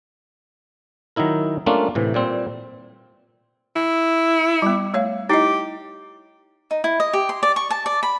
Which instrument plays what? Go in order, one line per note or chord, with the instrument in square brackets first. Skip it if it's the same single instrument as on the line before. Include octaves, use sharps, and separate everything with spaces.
[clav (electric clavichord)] D#3 F#3 D#4 E4 A#4
G3 A3 A#3 C#4 D4 F4
A2 C3 E3
A#2 G3 C4
[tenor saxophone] E4
[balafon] G3 B3
A3 C#5 F5
[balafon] D#4 E4 D#5 [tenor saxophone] G4
[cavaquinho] D#4
E4
D#5
G4
C6
D5
C#6
A5
D5
B5